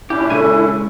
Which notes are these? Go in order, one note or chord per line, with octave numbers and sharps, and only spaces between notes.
A#2 C#4 D4 E4 G4
C#3 G#3 A4 G#5